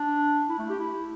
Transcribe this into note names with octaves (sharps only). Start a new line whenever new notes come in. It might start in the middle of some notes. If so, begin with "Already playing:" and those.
Already playing: D4
E4
A3
G4
E4